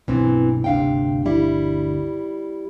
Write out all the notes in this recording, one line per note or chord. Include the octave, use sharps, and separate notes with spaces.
B1 G2 B2 E3 C4
G1 D2 C3 D4 F5 G5
G3 E4